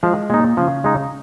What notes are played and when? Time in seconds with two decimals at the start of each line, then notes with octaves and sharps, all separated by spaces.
0.03 F3 G#3
0.30 A#2 G#3 D#4
0.57 C#3 F3
0.84 G#3 D#4